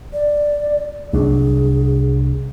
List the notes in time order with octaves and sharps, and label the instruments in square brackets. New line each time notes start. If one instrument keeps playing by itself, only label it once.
[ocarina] D5
[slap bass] C2 F#3 D4 [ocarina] G#4